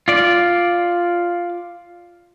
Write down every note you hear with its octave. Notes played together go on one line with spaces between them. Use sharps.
F4 D5